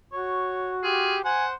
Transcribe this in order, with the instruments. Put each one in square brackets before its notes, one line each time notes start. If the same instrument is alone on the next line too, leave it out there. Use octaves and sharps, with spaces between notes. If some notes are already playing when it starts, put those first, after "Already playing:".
[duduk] F#4 [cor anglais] C#5
[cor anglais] F4 [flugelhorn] G4 [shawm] G#4
[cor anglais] C5 [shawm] F#5 [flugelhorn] G#5